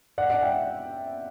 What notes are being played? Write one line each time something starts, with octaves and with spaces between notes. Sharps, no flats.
D5 F#5
D5 F#5
E5 G5